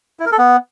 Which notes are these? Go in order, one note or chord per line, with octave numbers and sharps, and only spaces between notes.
E4
A#4
A4
B3